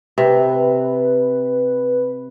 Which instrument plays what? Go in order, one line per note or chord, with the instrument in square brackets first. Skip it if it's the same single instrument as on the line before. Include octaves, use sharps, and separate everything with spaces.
[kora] C3 [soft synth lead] B4